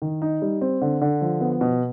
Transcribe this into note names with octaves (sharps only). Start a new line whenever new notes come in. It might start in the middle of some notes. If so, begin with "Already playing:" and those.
D#3
D#4
G3
C4
D3
D3
F3
B3
B2